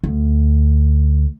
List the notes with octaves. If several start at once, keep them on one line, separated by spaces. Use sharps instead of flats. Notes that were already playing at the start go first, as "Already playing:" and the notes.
D2